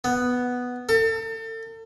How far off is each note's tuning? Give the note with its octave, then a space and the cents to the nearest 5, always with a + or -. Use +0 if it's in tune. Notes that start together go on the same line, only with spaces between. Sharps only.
B3 +0
A4 +35